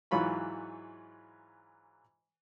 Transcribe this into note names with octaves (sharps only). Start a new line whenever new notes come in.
G#2 E3 F#3 F4 B5 C#6